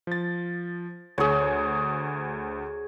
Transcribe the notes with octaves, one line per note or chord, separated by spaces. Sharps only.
F3 A6
D2 G#4 C#5